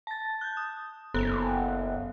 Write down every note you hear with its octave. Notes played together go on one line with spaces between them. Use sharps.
A5 A6
F#6 G6
D#6
F#1 B3 A4 F#6